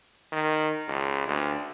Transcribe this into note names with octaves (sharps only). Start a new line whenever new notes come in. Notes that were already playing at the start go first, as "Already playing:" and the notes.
D#3
C#2
D2